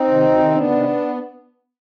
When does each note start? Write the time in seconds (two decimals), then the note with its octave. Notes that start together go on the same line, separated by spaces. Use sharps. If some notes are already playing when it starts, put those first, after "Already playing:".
Already playing: C4 D#4
0.09 C3 D#3
0.24 D2
0.39 C3 D#3
0.55 D2 B3 D4
0.70 C3 D#3